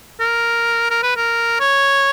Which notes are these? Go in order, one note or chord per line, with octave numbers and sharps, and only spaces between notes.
A#4
A#4
B4
A#4
C#5